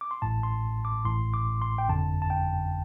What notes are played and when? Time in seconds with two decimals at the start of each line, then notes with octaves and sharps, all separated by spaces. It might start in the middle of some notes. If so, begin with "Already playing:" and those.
0.01 D6
0.11 C6
0.22 A1 A2 A5
0.43 C6
0.85 D6
1.05 A1 A2 C6
1.34 D6
1.62 C6
1.78 G5
1.89 G1 F2 D3 A5
2.22 A5
2.30 G5